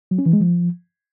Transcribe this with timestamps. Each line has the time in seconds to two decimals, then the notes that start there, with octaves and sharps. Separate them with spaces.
0.11 F#3
0.19 C#4
0.26 E3
0.33 G#3
0.41 F3